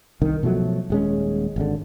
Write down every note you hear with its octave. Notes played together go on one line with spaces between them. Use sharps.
C2 D#3
B2 F3 F#3 A3
D#1 G#3 C#4
G#1 D3